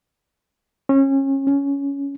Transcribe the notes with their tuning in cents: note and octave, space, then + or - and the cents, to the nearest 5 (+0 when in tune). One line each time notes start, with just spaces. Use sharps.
C#4 -30
C#4 +10